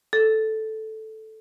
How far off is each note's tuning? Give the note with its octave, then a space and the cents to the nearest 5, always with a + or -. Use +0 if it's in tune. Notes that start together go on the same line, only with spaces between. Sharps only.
A4 -5